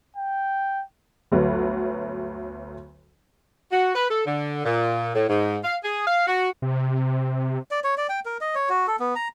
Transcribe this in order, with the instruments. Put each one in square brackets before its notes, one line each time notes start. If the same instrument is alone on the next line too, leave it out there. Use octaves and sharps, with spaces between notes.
[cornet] G5
[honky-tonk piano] G1 D2 F#3 B4
[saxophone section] F#4
B4
A4
D3
A#2
A2
G#2
F5
G#4
F5
F#4
[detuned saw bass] C3
[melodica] D5
C#5
D5
G5
A#4
D#5
C#5
F#4
A4
B3
A#5